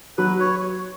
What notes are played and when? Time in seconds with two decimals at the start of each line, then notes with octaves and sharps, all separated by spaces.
0.18 F#3 B4
0.40 C#5